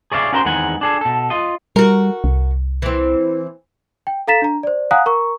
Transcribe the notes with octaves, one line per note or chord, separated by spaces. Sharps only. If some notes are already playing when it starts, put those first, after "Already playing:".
G#4 C#5 D5 E5 F5
C#4 F#4 A#4 C5 A#5 C6
E2 D#3 G#3 C4 F#5 G#5
D4 G#4 A4
B2 A4
F4 D#5
G3 F#4 A#4
C2
E3 C4
G5
A4 F5 A#5 A6 B6 E7
D4 A#5
C5 D5
F5 F#5 G#5 A#5 D#6 F#6
A#4 A#5 C#6